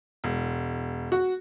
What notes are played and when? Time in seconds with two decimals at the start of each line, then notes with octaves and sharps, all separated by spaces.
0.24 E1
1.12 F#4